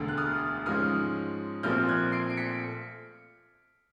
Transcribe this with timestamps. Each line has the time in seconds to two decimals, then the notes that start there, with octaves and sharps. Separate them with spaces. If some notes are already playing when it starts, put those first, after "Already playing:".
Already playing: E1 D2 D3
0.08 F#6
0.17 D#6 F6
0.66 G#2 F3 G#3 C#4 D#6 F6
1.63 A#1 A#2 F3 A3 C4 F6 G6
1.88 F#6 G#6
2.12 C7 D7
2.30 D7
2.37 B6 C#7